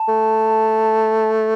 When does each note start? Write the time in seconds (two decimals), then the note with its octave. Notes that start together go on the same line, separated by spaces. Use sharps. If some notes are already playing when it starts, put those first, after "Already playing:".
Already playing: A5
0.08 A3